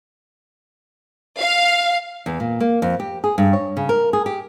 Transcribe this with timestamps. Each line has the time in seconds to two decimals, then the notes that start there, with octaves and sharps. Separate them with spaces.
1.40 F5
2.26 E2
2.40 A#2
2.60 A#3
2.82 F2
3.00 G4
3.24 G#4
3.38 G2
3.53 C#5
3.77 C#3
3.89 A#4
4.13 G#4
4.26 G4